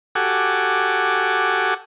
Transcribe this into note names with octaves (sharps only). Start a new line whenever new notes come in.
F#4 G4 A4 F#5 G#5 D6